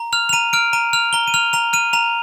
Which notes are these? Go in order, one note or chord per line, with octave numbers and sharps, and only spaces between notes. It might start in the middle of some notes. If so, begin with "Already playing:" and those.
Already playing: A#5
F6 F7
F7
A#5 D#7
F6 D7
A#5 D#7
F6 F7
A#5 G7
D#7
F6 F7
A#5 F7
F6 D#7
A#5 F7